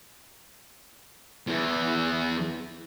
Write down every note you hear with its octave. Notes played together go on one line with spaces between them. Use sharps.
E2 E3